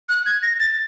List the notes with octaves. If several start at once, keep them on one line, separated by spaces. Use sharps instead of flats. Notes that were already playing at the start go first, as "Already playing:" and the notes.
F#6
G#6
A#6
A6